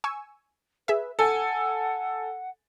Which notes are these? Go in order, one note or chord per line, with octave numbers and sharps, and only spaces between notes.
G#5 C#6 E6
G#4 B4 E5
A4 F#5 G#5